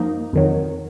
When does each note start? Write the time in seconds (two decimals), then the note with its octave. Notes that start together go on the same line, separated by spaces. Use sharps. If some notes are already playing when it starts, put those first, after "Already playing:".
Already playing: F#2 F3 A#3 D#4
0.33 F2 D#3 F#3